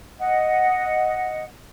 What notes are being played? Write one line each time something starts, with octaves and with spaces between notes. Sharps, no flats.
D#5 F#5